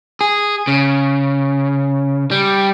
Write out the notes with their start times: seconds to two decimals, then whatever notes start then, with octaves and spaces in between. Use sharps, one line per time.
0.21 G#4
0.67 C#3
2.31 G3